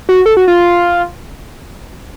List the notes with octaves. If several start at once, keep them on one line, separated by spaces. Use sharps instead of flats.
F#4
A4
F#4
F4